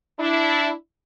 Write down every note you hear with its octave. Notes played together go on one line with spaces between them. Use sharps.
D4 E4